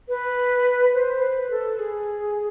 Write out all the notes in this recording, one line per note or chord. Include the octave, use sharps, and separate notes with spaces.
B4
C5
B4
A4
G#4